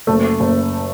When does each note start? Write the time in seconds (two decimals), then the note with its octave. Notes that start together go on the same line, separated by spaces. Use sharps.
0.07 F#1 A3
0.40 F#1